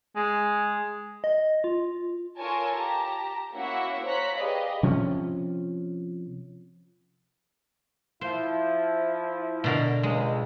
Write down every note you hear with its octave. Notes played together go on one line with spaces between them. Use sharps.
G#3
D#5
F4
F4 A4 A#4 C#5 G#5 A5
G4 A5 A#5
A#3 C#4 E4 F#4 E5 F#5
C5 C#5 A#5 F#6 B6
G4 G#4 B4 D5 D#5 F5
C3 F3 C#4
F3 E4 C5
B2 D3 A#4
C#2 G#3